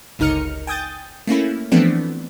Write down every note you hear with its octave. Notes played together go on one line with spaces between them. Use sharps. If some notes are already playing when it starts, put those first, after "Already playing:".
G1 C#2 D#4 A#4 F6 C#7
G5 G#5 D#6 G6 A6
A3 A#3 C#4 E4
E3 F3 A3 B3 C4 D4